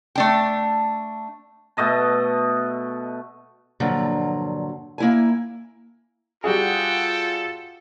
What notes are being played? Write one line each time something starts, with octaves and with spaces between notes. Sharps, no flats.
A3 D4 G5
B2 A3 D#5 A5
G2 A#2 D3 F3 F#3
A#3 E4 G#5
G3 F4 F#4 G#4 A4 F#5 G5